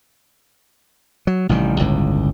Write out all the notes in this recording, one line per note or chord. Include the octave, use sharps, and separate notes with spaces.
F#3
A1 C3 D#3 G3
G1 C#2 A2